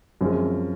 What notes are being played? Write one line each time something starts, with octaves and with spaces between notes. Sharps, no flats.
F#2 F3 G#3 C4